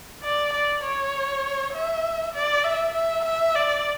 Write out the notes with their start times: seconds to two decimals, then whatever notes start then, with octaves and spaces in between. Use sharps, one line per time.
0.23 D5
0.53 D5
0.83 C#5
1.74 E5
2.34 D5
2.64 E5
2.94 E5
3.25 E5
3.55 D5